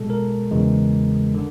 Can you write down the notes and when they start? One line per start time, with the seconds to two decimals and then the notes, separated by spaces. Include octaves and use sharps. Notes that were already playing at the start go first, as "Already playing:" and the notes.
Already playing: B2 G#3 A4
0.10 A#4
0.51 E2 C#3 E3 G#3
1.35 D3